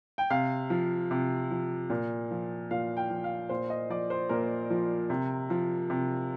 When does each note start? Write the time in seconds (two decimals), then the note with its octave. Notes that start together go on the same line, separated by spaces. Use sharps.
0.18 G5
0.30 C3 F5
0.70 F3
1.11 C3
1.51 F3
1.90 A#2
2.31 F3
2.71 A#2 F5
2.97 G5
3.10 F3
3.24 F5
3.49 A#2 C5
3.70 D#5
3.90 F3 D5
4.10 C5
4.29 A#2 A#4
4.70 F3
5.10 C3
5.50 F3
5.90 C3